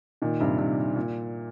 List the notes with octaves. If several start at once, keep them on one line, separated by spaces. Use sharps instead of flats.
A#2 D#3
G2 C3
G2 C3
A#2